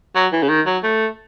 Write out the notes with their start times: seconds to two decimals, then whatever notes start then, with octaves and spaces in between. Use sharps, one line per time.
0.15 F#3
0.32 E3
0.43 C#3
0.49 D#3
0.66 F#3
0.83 A3